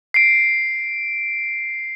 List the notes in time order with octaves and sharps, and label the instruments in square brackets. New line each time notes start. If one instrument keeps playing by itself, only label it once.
[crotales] C7 D7